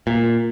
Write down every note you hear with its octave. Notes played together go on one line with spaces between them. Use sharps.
A#2